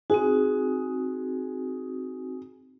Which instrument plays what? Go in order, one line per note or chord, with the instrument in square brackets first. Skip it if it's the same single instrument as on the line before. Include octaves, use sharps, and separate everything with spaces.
[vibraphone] C4 D#4 F#4 [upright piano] G#4